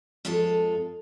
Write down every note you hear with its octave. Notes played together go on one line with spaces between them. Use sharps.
F2 G#3 F4 A4 A5